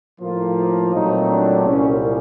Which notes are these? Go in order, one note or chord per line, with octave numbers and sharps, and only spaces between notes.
A2 F3 A#3 F4
A#2 F#3 A3 C4 D#4
D4
C2 A#2 G3 A#3 C#4